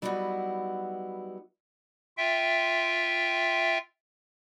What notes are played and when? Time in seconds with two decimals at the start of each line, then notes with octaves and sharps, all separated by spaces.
0.02 F#3 G3 B3 D#4 E4 F#4
2.17 F4 E5 G5